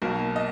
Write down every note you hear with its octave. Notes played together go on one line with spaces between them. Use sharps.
B1 B2 A#3 A#4
D#5